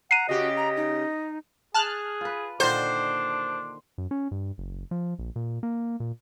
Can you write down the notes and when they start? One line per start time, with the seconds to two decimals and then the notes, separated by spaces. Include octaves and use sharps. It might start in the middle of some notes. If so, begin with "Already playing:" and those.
0.11 F#5 A#5 C7 D#7
0.29 C#3 F#4 G4 D#5
0.56 A#5
0.76 D#4
1.74 G#4 A5 F6 F#6
2.21 F4 B4
2.60 A#2 D3 D#3 D4 C5
3.98 F#2
4.11 C#4
4.31 G2
4.58 F#1
4.91 F3
5.19 A#1
5.36 A#2
5.63 A#3
6.00 A#2